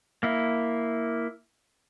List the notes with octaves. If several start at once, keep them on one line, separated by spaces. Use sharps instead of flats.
A#3 E4